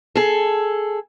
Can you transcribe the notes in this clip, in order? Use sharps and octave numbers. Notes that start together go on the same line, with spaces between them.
G#4 A4